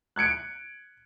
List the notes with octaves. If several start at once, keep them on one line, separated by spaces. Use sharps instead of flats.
F#6 G#6 C#7 D7